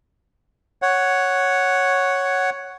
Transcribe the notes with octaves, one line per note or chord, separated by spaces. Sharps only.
C#5 F#5